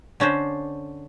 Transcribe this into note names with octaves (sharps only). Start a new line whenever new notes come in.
D3 C#4 D4 C5